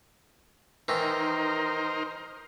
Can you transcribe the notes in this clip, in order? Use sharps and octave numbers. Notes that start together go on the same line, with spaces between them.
D#3 E3 D#4 A#4 C5